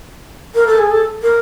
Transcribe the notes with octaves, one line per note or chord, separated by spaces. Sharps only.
A#4
A4
G#4
A4
A#4